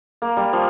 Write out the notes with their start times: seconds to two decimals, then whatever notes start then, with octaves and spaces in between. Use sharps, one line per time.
0.22 A#3
0.37 G3
0.53 F3